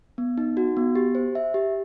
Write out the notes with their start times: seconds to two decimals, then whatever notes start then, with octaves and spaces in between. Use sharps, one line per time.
0.18 B3
0.38 D#4
0.57 F#4
0.77 B3
0.95 G4
1.15 C5
1.35 E5
1.54 G4